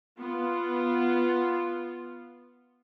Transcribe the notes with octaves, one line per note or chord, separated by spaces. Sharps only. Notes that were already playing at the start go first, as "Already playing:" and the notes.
B3 F4